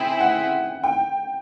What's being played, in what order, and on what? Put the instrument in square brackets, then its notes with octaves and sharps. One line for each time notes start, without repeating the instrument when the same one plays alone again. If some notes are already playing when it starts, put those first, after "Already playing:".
Already playing: [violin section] C4 E4 G#4 [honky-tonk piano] G5 G#5
[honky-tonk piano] F#5
G5